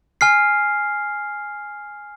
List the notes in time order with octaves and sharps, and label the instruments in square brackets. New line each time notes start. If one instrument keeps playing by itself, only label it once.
[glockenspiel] G#5 F6 C7